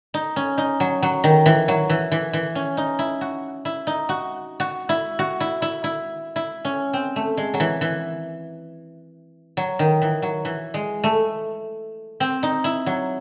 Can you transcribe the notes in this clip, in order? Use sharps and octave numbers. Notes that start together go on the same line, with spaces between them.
D#4
C#4
D#4
F#3
F#3
D#3
E3
F#3
E3
E3
E3
C#4
D#4
E4
F#4
E4
D#4
F#4
F#4
E4
F#4
E4
E4
E4
E4
C#4
C4
A3
G#3
F#3
E3
E3
F#3
D#3
E3
F#3
E3
G#3
A3
C4
D#4
E4
F#3